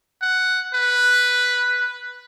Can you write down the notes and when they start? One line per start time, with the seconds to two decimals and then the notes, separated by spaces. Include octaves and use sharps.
0.22 F#5
0.74 B4